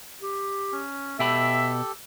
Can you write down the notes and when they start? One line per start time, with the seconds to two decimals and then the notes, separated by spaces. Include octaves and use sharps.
0.21 G4
0.72 C#4
1.19 B2 G4 A4 E5 G5 B5